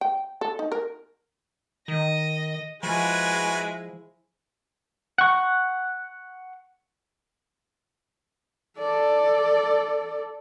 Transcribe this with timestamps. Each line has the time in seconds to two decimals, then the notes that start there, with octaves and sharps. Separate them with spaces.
0.01 G5
0.41 A4
0.59 D#4
0.72 A#4
1.88 D#3 D#5
2.83 F3 G#3 E4 F#4 B4 G#5
5.18 F#5 C#6
8.79 A4 D5